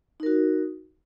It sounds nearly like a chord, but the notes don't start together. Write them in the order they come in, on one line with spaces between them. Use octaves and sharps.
D#4 A#4 F#4